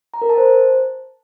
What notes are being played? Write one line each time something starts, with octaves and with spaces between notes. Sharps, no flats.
A#5
A#4
A5
C5